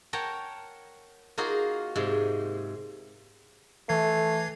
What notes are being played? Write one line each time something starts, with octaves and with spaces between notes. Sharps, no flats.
A#4 C#5 F#5 G5 A5 A#5
A#3 D#4 F4 F#4 G#4 A#4
G#2 C3 G#3
E3 A3 G#6 C7